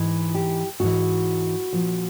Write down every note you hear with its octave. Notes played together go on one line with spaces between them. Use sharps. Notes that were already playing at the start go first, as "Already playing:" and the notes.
Already playing: G#2 E3
G4
G#2 E3 F#4
A#2 F3